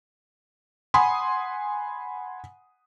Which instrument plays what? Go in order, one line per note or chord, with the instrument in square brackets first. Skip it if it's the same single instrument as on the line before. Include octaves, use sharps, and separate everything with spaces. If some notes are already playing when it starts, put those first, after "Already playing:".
[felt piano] F#5 G#5 B5 C6 D#6